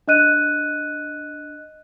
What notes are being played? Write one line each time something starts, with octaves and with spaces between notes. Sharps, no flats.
D4 D#5 F#6 D#7